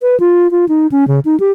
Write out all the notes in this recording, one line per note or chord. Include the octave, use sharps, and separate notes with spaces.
B4
F4
F4
D#4
C#4
C#3
D#4
G4